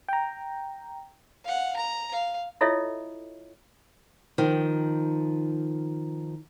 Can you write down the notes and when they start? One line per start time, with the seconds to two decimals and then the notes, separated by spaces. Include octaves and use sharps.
0.09 G5 A#5
1.44 F5 F#5
1.76 A#5
2.12 F5
2.61 E4 F4 A4 C#5 D#5 E5
4.38 D#3 F3